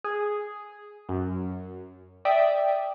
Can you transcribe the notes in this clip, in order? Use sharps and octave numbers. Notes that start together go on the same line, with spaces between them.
G#4
F#2
D5 E5 G5 D#6 B6 D7